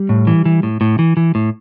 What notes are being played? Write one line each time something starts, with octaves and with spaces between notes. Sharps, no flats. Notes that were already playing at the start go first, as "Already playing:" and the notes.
Already playing: G3
A2
E3
E3
A2
A2
E3
E3
A2